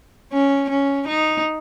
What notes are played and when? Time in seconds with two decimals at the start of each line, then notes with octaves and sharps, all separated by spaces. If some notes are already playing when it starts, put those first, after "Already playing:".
0.33 C#4
0.70 C#4
1.08 D#4